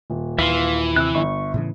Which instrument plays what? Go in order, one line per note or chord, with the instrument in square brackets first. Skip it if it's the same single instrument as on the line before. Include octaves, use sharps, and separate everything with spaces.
[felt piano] D#1
[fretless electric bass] D#2 [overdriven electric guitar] E3 [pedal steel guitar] E5 F5 C6
[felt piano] C3 [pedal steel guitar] E6 F#6
[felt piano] G1 [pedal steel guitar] C#6
[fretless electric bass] A2 C#3 E3